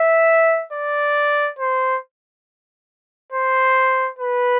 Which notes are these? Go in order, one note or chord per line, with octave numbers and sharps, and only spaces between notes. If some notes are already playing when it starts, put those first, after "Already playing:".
Already playing: E5
D5
C5
C5
B4